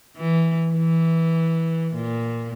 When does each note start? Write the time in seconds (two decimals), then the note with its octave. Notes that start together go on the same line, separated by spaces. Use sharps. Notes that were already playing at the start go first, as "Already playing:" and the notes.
0.17 E3
0.73 E3
1.95 A#2